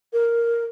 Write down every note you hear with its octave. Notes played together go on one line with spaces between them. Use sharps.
A#4